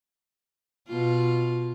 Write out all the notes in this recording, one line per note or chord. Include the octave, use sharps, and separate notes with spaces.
B2 F4